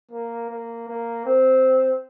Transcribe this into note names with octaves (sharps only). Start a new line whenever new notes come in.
A#3
A#3
A#3
C4